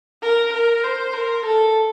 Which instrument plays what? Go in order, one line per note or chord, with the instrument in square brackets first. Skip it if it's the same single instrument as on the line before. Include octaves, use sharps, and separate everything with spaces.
[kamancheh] A#4
A#4
C5
A#4
A4